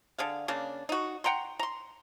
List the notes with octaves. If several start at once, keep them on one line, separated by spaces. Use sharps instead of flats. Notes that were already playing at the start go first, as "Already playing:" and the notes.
D3 G#4 F5
C#3 A#3 D4
D#4 F#4
F#5 G5 A#5 C6
A#5 C6